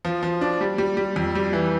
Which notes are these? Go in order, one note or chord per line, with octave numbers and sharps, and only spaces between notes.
F3
F3
D4
G3
G3
G3
F2
G3
E3